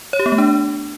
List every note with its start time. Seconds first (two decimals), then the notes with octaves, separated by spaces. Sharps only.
0.13 C#5
0.19 G4
0.26 B3
0.32 A3
0.38 D4